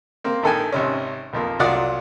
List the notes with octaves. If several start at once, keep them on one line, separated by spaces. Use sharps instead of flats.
A#3 C4
A#1 D#3 A4 G5 G#5
G#1 C3 C#4
B1 F2 A#3
C2 F#3 F4 D5 F#5 D#6